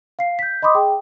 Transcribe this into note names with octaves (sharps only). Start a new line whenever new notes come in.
F5 C7
G6 B6
D#5 B5 C6 D6 D#6
G#4 G5